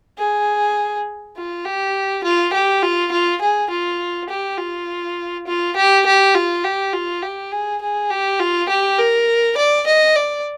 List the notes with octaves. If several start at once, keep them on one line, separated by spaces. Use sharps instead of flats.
G#4
F4
G4
F4
G4
F4
F4
G#4
F4
G4
F4
F4
G4
G4
F4
G4
F4
G4
G#4
G#4
G4
F4
G4
A#4
D5
D#5
D5